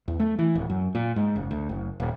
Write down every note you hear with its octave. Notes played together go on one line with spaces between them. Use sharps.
E2
A3
E3
D1
F#2
A#2
G#2
F#1
D2
F#1
D#1